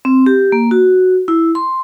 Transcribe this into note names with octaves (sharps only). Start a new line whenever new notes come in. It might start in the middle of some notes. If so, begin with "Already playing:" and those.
C4
G4
A#3
F#4
E4
C6